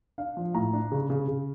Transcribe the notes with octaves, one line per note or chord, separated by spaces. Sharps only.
D4 F5
F3
A2 A#5
D4
C#3
C#3
C#3